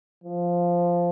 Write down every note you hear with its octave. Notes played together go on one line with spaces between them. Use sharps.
F3